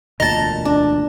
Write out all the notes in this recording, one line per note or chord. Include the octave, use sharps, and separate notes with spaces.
E1 D2 A#2 D#5 A5 A#5 A6
D4